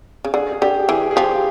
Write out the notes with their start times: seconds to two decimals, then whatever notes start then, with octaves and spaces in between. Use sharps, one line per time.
0.25 C#3
0.34 D3 G#4
0.52 G#4
0.62 D3 G4
0.88 E3 G#4
1.11 G#4
1.16 F3 G4